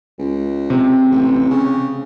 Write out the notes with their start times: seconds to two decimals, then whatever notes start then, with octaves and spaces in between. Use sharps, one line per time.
0.19 C#2
0.70 C3
1.11 A1
1.50 C#3